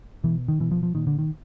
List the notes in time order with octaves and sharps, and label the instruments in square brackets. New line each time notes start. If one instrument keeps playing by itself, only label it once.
[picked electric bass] B2 E3
D#3
B2 E3
F3
F3
A#2 D#3
D3
D#3